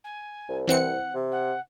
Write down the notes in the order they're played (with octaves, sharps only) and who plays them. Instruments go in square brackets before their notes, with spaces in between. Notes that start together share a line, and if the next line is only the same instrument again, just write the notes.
[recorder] G#5
[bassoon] C2
[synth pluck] E3 C4 C#7 [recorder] F#5
[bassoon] C3
[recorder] F#5